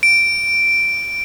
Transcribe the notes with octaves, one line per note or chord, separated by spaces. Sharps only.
D7